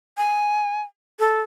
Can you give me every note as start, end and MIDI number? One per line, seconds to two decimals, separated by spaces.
0.17 0.82 80
1.19 1.40 69